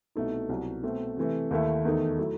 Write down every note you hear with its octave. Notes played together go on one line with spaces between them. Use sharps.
C2 B2 A3 D#4
C2 B2 F#3
B2 A3 C4
C3 E3 A3
D#2 D#3 A3 E4
E2 D#3 A3 D#4
F#3 A3 E4